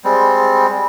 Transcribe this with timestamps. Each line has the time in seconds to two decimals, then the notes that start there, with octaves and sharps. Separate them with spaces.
0.04 G3 G#3 C4